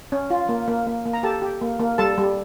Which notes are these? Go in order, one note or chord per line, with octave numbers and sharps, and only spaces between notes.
C#4
F4
A#3
A#3
A#3
A#3
A#5
G4 A4 A5
G4
A#3
A#3
G3 A4 A5
G3